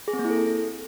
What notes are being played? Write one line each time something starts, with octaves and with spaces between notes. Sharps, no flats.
G#4
C4
A#3
E4
A4